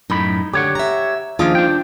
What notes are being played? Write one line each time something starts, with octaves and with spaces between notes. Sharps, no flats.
F#2 A2 D#4 B5
D3 G4 C#5 F#5
E5 A#5
D#2 F3 D4 D#4 F4 G#4
D4 G5